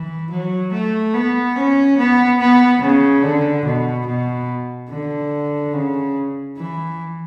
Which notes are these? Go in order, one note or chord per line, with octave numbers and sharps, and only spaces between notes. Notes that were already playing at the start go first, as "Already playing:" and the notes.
Already playing: E3
F#3
A3
B3
C#4
B3
B3
C#3
D3
B2
B2
D3
C#3
E3